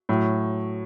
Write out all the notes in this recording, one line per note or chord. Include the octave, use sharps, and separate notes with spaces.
A2 F#3